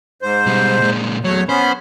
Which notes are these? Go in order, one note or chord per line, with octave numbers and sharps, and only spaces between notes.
G#2 C5
B2 G3
A#2 G#3
E2 F#3 A3 C#5
B3 C#4 C5 B5